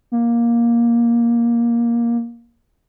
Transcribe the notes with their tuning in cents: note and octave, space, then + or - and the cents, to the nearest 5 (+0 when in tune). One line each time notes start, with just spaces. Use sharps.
A#3 +10